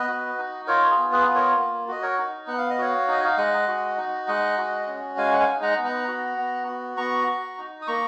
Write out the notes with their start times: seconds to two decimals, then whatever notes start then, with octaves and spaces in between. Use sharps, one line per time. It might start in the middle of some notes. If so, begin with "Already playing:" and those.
Already playing: B3 B4 D#5
0.08 F#4
0.38 D#4
0.67 F4 A#4 C#5
0.91 G#4
0.98 B3
1.12 G#4 B4
1.28 F4
1.35 A#4 C#5
1.57 A#3
1.88 F#4 D#5
2.02 A#4 C#5
2.18 D#4
2.47 B3 F#5
2.58 F5
2.70 D#5
2.78 F#4 C#5 F5
3.08 D#4 D#5
3.24 F5
3.38 G#3 D#5 F#5
3.68 F#4
3.98 D#4
4.28 G#3 D#5 F#5
4.58 F#4
4.87 C#4
5.17 G#3 F5 G#5
5.33 F#5
5.40 F5 G#5
5.47 D#4
5.62 F#5 A#5
5.78 B3
5.85 F#5 A#5
6.08 F#4
6.38 B3
6.68 F#4
6.97 B3 A#5 C#6
7.27 F#4
7.58 D#4
7.82 D#6
7.87 A#3 A#5 C#6